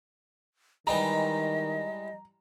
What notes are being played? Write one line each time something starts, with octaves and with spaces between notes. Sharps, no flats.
D#3 E3 G3 G#3 D#5 A#5